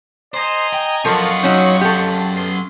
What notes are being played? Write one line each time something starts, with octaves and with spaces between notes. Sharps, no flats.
C5 D#5 G#5 A#5
G5
F#2 F3 F4 A4 A#4 D#5 F#5 C#6
F#3 C#4 D#4
G4 A4
B3 C6